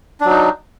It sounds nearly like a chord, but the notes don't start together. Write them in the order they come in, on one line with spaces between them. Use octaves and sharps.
D4 F#3 D#4